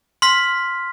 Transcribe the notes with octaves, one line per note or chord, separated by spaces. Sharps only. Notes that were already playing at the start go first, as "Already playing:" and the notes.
C6 F6 B6